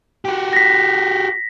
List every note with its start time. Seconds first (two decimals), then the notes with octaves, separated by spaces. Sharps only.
0.25 F#4 G4
0.53 A#6 B6